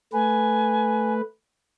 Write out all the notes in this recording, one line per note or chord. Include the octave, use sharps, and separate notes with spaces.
A3 B4 G#5